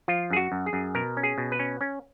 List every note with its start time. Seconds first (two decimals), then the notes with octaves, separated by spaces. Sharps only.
0.08 F3 F4
0.30 F#2 G#4
0.36 F#4
0.52 F#2
0.66 G#4
0.73 F#2
0.95 B2 A#4
1.17 C#4
1.23 G#4
1.38 B2
1.52 B4
1.59 C#4
1.81 C#4